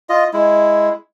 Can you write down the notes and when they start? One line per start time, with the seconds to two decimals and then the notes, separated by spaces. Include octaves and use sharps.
0.09 F4 D#5
0.33 G#3 E4